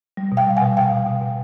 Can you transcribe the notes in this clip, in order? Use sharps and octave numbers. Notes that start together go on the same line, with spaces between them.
G3
B2
F5 G5
G3
F#5 G#5
B2
B2 F5 G5
B2
B2
B2